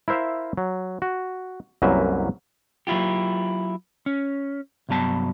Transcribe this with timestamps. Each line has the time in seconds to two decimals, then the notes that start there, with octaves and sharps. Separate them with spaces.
0.08 E4 A#4 C5 E5 F5
0.57 F#3
1.02 F#4
1.82 C2 F#2 F#3 A#3 B4 E5
2.87 F#3 A#3 E4 F4 G4
4.06 C#4
4.89 C2 G2 F#3 B3 A5